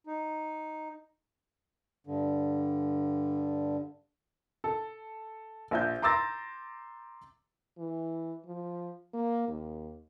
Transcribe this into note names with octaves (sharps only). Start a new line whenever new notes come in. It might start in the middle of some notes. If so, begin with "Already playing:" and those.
D#4
G2 D3
A4
A#1 E5 G6
A#5 C6 D6 E6 A6 A#6
E3
F3
A#3
D#2